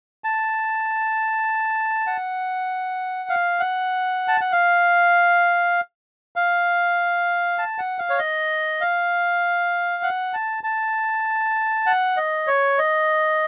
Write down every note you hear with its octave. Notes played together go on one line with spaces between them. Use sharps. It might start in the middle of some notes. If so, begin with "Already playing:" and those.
A5
F#5
F5
F#5
A5
F#5
F5
F5
A5
F#5
F5
C#5
D#5
F5
F#5
A5
A5
F#5
D#5
C#5
D#5